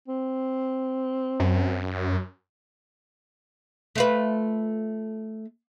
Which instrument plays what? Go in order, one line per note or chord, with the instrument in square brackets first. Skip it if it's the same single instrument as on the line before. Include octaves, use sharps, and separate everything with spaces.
[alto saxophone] C4
[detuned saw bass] F#2
[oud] A3 F4 B4